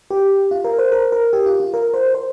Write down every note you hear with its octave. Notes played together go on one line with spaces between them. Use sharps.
G4
F4
A#4
C5
A#4
A#4
G4
F4
F4
A#4
C5
C5